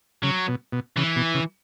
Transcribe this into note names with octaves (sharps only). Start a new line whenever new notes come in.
C#3 F#3
B2
B2
C#3 E3
B2
C#3